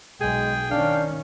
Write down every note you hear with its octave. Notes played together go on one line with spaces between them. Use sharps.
B1 G#3 G#4 G5
D#3 C#4 D4 F5